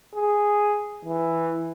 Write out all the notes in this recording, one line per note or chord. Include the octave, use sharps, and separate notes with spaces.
G#4
E3